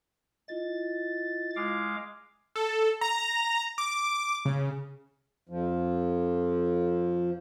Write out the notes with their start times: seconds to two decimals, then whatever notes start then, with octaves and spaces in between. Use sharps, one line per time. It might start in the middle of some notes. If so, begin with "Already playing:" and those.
0.48 E4 F4 D#5 A6
1.56 G#3 F5 D6
2.56 A4
3.01 A#5
3.78 D6
4.45 C#3
5.49 F2 F3